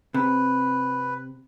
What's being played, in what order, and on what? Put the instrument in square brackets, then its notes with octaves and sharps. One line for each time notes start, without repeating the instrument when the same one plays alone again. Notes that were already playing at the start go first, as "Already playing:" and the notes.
[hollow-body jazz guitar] C3 [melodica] B4